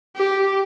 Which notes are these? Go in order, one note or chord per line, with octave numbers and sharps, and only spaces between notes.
G4